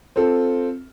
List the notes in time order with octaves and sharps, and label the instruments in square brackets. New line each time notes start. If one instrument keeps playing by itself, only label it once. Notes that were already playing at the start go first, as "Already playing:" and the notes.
[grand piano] C4 F4 A4